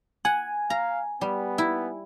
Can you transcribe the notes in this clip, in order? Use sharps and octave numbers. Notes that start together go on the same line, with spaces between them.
F#5 G#5
F5 A#5
G3 B3
E4